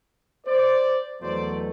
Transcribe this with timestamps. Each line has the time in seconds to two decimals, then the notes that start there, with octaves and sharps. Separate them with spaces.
0.47 C5 D5
1.22 E2 B2 F#3 A3 C5 D5